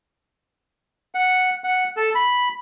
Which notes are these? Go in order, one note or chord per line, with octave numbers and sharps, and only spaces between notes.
F#5
F#5
A4
B5